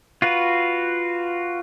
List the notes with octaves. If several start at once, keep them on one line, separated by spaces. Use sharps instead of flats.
F4 F#4 B4